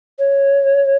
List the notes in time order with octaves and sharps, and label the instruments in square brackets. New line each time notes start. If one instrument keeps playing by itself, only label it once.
[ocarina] C#5